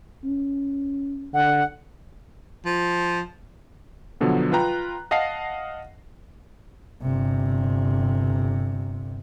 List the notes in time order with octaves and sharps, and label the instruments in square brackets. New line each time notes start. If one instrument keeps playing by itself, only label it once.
[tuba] C#4
[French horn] D3 [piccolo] F#5
[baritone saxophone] F3
[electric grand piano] B2 D3 F3 F#3 B3
F4 B4 G5 A#5 F#6
D#5 F5 F#5 A5 A#6 C7
[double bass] G1 C3